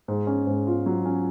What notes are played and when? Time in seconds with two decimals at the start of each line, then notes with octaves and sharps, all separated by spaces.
0.08 G#2
0.27 C#4
0.47 G#2
0.67 F4
0.86 F#3
1.05 C#4